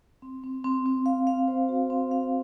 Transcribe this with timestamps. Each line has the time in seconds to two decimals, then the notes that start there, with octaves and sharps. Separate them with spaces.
0.22 C4
0.44 C4
0.64 C4
0.86 C4
1.06 F5
1.27 F5
1.48 C5
1.69 F#4
1.90 C4
2.11 F5